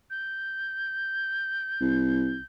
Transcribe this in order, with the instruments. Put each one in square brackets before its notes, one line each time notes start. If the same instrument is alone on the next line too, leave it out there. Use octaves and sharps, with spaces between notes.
[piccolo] G6
[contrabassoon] C2